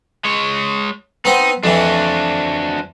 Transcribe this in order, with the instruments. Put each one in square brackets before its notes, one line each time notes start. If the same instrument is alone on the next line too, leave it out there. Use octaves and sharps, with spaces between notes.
[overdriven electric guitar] G#3 C#5
[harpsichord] B3 C4 C5 [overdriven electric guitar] D#4
[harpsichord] F2 E3 [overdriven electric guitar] D4 F#4